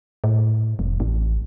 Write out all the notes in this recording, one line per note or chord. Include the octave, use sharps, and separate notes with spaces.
A2
F1
A1